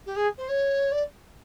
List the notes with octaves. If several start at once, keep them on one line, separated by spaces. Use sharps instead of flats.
G4
G#4
C5
C#5
D5